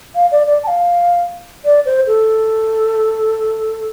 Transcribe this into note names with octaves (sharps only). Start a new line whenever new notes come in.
F5
D5
D5
A5
F5
D5
C5
A4